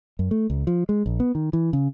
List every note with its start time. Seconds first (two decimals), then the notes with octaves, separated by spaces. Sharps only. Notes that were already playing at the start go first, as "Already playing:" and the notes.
0.19 F#2
0.31 A3
0.50 C#2
0.67 F3
0.89 G#3
1.06 A#1
1.20 B3
1.35 D#3
1.53 E3
1.73 C#3